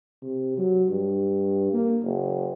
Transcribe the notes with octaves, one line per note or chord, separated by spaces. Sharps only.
C3
F#3
G2
A#3
F#1